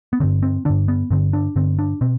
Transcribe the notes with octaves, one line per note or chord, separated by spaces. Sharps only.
B3
G2 D3 C4
C4
G2 D3 D4
B3
G2 D3 C4
D4
G2 D3 C4
D4
B2 C4